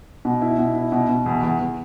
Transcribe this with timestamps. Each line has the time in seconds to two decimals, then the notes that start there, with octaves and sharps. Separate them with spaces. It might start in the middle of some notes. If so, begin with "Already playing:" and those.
0.25 B2
0.42 E4
0.58 B2
0.75 E4
0.92 B2
1.09 B2
1.26 E2
1.43 E2
1.60 E2